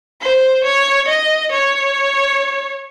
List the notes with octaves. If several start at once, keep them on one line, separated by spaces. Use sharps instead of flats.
C5
C#5
D#5
C#5